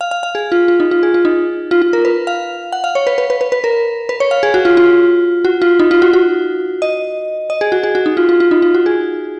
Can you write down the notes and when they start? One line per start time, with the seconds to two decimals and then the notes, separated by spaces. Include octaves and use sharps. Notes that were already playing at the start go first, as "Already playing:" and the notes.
0.01 F5
0.11 F5
0.23 F5
0.35 G#4
0.52 F4
0.68 F4
0.80 D#4
0.91 F4
1.03 G#4
1.14 F4
1.25 D#4
1.71 F4
1.82 F4
1.93 A#4
2.05 B4
2.27 F5
2.72 F#5
2.84 F5
2.95 C#5
3.07 B4
3.18 B4
3.30 B4
3.41 B4
3.52 B4
3.64 A#4
4.09 B4
4.20 C#5
4.31 F5
4.43 G#4
4.54 F#4
4.65 F4
4.77 F4
5.45 F#4
5.62 F4
5.79 D#4
5.91 F4
6.02 F#4
6.13 F#4
6.82 D#5
7.50 D#5
7.61 G#4
7.72 F#4
7.83 G#4
7.95 F#4
8.06 D#4
8.17 F4
8.29 F4
8.40 F4
8.51 D#4
8.62 F4
8.74 F#4
8.86 G#4